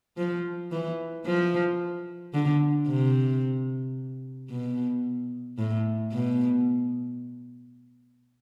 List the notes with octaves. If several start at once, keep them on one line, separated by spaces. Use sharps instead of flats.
F3
E3
F3
D3
C3
B2
A2
B2